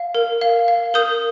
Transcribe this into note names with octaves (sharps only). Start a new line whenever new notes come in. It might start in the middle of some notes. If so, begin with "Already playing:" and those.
Already playing: F5
A#4
F5
F5
A#4 D#6 G6